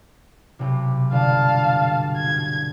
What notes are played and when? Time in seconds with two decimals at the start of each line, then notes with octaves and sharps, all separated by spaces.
0.59 B1 C3
1.12 G1 D3 F5 A5
2.17 G#6